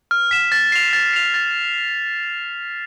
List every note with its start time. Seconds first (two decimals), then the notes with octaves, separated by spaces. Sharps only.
0.11 F6
0.31 B6 E7
0.52 A6
0.72 C7 F7
0.93 A6
1.14 C7 F7
1.34 A6